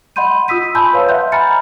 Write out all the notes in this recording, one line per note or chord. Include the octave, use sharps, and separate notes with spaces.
D#5 F#5 B5 C6 G6 D#7
F4 D#6 E6 B6 D#7
G#5 A5 B5 C6 E6 G6
B4 C#5 F5
D#5 E5 F#5 C6 F#6 G6
G#5 A#5 B5 F6 A6 C#7